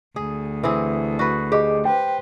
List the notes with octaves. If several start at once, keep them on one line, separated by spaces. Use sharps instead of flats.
D2 G#4
E3 C4 G#4
F#4 B4
G4 G#4 D#5 D6
B4 C5 G5